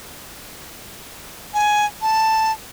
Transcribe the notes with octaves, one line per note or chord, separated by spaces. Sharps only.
G#5
A5